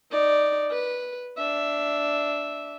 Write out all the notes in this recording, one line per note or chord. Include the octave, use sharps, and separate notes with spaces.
D#4 D5
B4
D4 E5